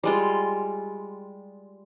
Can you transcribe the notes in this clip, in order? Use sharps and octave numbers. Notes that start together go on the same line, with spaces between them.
G3 G#3 F4